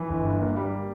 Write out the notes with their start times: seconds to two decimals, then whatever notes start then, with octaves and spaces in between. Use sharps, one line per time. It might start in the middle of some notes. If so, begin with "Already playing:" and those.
Already playing: E3
0.09 G1
0.25 G2
0.40 A#3
0.56 G3